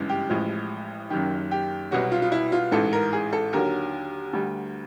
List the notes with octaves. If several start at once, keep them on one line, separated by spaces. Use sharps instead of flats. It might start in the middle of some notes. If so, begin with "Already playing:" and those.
Already playing: G1 F#2 C#3 E3 G#3
G4
A1 A2 F3 G#3
F#1 F#2 D#3 G4
G4
C2 B2 F#3 F#4
F4
F4
E4
F4
A1 G#2 E3 A4
A#4
G#4
A4
D#2 D3 F#3 A#4
D2 D3 G3